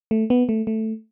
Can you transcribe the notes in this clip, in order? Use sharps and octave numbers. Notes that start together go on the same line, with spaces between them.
A3
B3
A3
A3